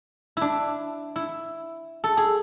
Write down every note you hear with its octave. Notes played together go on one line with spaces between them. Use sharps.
D4 E4
E4
A4
G#4